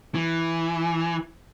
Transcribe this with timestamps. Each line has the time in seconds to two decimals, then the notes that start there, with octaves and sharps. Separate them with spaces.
0.15 E3